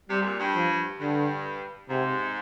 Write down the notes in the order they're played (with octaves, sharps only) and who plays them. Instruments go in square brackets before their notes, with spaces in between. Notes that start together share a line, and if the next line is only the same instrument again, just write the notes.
[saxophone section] C3 [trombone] G3
[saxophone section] G#2
A#2
G2
[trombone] F3
[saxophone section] G2 [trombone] D3
[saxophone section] G#2 [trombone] C3